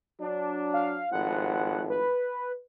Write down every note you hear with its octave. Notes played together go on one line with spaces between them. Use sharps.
F#3 D4
F5
G#1 A2 F3 F#5
B4